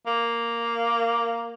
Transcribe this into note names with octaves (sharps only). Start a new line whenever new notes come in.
A#3